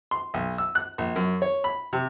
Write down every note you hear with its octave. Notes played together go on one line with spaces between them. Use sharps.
C6
B1
E6
F#6
A#1
F#2
C#5
B5
C3